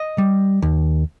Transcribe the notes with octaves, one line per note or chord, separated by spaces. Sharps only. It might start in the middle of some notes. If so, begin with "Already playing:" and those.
Already playing: D#5
G3
D#2